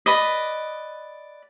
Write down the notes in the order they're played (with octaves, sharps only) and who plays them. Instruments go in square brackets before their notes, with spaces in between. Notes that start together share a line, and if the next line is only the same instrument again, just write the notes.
[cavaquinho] B4 D5 D#5